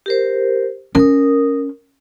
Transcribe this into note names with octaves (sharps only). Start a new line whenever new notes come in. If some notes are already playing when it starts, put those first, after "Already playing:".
G4 A#4 C5
C#4 A#4 D#6